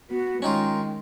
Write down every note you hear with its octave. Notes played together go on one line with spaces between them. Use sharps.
B3 F#4
D#3 G#3 C#4 D#4 F4 G5